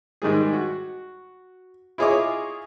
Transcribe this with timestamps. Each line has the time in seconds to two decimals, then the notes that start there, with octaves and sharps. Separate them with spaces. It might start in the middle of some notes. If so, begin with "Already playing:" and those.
0.22 G#2 D#3 G3 G#4
0.53 F#4
1.98 E4 F4 G#4 C#5 D#5 D6